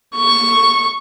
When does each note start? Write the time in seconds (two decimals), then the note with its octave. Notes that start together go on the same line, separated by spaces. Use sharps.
0.16 C#6